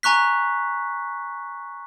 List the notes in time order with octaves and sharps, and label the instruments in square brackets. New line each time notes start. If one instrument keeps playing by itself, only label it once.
[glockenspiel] G#5 A#5 C#6 F#6 B6